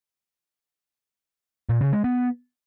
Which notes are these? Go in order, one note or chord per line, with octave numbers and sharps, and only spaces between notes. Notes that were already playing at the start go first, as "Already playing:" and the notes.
A#2
C#3
G#3
B3